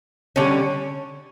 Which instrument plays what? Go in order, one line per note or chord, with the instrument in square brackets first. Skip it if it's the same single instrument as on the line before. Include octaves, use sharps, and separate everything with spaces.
[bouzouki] D3 G3 C#4